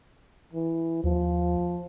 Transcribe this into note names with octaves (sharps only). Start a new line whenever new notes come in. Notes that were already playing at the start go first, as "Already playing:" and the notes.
E3
D#2 F3